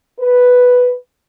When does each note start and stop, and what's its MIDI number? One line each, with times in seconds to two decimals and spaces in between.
0.19 0.92 71